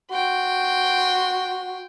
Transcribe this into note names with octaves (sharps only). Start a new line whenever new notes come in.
F#4 G5 C6